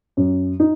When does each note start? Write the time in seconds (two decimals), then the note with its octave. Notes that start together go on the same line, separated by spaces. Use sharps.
0.17 F#2
0.60 D#4